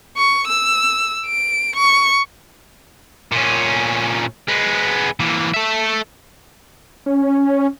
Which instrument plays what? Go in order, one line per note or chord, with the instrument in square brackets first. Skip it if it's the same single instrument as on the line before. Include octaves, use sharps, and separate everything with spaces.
[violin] C#6
E6
D7
C#6
[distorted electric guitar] A#2 C#4
G#3 B3
E3 A#3
A4 E5
[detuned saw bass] C#4